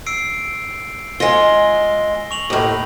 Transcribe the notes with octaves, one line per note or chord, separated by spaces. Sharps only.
E6 C7 D7
G#3 F4 A#6 G7
C#6 F7 F#7
D#2 A2